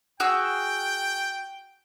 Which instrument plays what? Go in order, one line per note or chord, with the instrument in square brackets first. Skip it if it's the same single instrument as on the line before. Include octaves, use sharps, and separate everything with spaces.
[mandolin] F#4 G#4 E6 [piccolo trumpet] G5